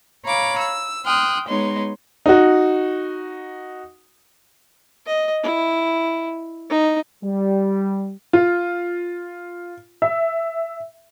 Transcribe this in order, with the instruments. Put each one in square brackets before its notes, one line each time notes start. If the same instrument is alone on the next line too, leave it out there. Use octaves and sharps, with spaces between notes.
[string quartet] C#5 F5 A#5 B5 D6
E6
G5 C6 D#6 F6 F#6
G#3 B3 D#4 C#5 C6
[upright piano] D#4 F#4
[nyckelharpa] D#5
E4
D#4
[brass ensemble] G3
[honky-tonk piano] F4
E5